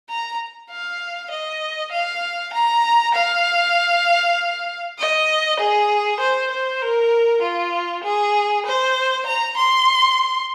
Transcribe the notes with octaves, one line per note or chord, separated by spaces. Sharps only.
A#5
F5
D#5
F5
A#5
F5
D#5
G#4
C5
C5
A#4
F4
G#4
C5
A#5
C6